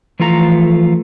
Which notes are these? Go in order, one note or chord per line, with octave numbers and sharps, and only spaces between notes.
E3 F3 A3 F4 A#5